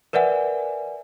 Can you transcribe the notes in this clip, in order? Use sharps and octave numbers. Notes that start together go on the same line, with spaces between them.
A#4 B4 D5 E5 F#5 G#5